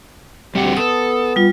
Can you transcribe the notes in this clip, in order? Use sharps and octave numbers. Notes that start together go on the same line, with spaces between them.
D2 G3 C4 G4 F#5
B3 A4 D#6
G3 F4